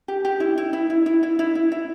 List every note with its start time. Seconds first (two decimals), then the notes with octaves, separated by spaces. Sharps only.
0.08 G4
0.25 G4
0.40 E4
0.58 E4
0.73 E4
0.90 E4
1.06 E4
1.23 E4
1.39 E4
1.55 E4
1.72 E4